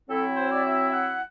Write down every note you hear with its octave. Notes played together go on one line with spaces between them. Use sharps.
F#3 C4 E4 A4
C5
D5
E5
F#5